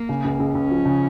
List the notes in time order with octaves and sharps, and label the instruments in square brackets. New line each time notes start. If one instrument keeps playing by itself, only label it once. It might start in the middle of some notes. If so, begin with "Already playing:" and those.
Already playing: [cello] A#3
[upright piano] C#3
C#2
C#2
[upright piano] C#2 [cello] C#4
[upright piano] F3
C#3